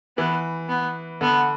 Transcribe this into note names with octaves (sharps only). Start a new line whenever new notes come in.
E3 B3
B3
D3 B3